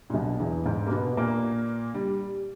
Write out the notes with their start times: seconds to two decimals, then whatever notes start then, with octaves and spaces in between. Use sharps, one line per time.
0.10 A#2
0.13 B1 B2
0.40 E2 E3
0.65 G#2 G#3
0.87 A#3
0.92 B2 B3
1.17 A#2 A#3
1.94 G3